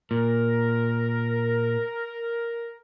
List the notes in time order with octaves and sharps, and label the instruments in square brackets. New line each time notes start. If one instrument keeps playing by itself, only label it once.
[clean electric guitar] A#2 [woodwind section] A#4